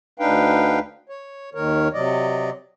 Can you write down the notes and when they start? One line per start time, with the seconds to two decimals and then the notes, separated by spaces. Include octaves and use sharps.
0.20 D2 D4 D#4 B4 F5 G5
1.09 C#5
1.55 D#2 D#3 A#4 C#5
1.94 C3 F#3 D5 D#5